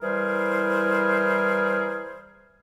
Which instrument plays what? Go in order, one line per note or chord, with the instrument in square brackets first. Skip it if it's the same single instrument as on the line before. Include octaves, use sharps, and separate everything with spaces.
[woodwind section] E3 G3 E4 G#4 A#4 C5